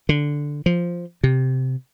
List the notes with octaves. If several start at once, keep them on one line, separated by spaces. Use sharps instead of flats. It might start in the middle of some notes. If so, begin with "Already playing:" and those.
D3
F3
C3